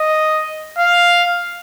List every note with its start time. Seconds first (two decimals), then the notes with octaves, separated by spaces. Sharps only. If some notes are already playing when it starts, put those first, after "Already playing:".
Already playing: D#5
0.79 F5